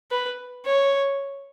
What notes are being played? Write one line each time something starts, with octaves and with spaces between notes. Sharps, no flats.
B4
C#5